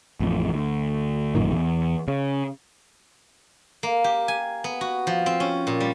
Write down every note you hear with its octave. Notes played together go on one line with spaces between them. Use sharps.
A1 F2
D2
A1 F#2 A#2 D#3
E2
C#3
A#3
G4
G#5
B3
F#4
F3
C4
C#4
A#2
G3